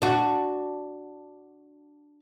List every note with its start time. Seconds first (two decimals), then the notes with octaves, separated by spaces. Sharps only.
0.02 D4 F#4